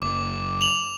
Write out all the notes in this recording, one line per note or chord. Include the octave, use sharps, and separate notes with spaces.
F#1 D6
F7 F#7